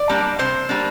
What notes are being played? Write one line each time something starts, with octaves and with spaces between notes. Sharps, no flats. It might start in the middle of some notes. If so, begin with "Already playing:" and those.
Already playing: D5
G3 A#3 D4
C3 C5
G3 A#3 D4